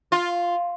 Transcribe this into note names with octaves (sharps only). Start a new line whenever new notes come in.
F4